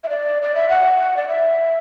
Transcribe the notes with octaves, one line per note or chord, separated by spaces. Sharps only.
E5
D5
D5
E5
F#5
D5
E5